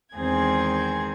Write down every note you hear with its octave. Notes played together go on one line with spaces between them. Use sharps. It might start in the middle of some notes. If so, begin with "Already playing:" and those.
E2 D#3 G#3 C4 G#4 G#6